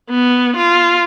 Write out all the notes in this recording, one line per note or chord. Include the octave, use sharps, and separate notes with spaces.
B3
F4